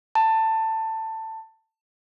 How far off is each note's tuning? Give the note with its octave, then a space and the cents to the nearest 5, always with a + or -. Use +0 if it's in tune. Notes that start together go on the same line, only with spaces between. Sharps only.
A5 +15